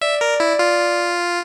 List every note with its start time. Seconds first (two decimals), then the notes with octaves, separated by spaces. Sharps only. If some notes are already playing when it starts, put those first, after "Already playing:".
0.01 D5 E5
0.21 A#4
0.40 E4
0.59 F4